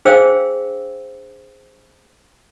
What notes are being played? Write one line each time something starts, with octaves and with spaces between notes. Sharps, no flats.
D4 G#4 C5 F5 G5 E6